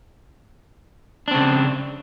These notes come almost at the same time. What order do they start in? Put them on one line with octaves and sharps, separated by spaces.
D4 C4 C#3